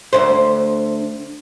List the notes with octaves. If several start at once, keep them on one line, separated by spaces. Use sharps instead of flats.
D2 G#2 C5